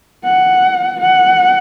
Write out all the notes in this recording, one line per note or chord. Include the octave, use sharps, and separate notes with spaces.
F#5
F#5